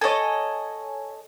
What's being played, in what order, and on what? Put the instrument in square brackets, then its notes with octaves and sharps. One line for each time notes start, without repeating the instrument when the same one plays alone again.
[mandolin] A4 D#5 [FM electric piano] C#5 G#5